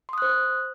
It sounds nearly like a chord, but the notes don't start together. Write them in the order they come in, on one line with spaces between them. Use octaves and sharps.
C6 D#6 F#6 C5